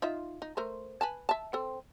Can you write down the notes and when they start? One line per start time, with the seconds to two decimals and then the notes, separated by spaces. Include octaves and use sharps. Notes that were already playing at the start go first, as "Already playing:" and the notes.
0.02 D#4 F4 E5
0.42 D#4
0.57 A3 A#4 C5
1.01 B4 G#5 A5
1.29 E5 A5
1.53 C4 A4